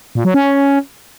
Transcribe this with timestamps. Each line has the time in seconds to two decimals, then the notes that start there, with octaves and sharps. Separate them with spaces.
0.15 A#2
0.25 F#3
0.34 C#4